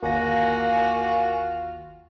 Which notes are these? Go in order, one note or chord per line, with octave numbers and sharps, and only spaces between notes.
G1 D#2 A#3 F4 F#4 G#5 A#6